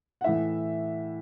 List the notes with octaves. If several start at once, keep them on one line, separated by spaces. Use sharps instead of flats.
F#5
A2 E3 E5